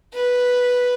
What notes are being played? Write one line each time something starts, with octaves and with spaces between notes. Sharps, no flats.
B4